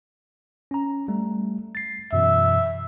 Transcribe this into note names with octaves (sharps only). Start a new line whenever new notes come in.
C#4 A#5
G3 A3
A6 C7
F#2 B2 E3 E5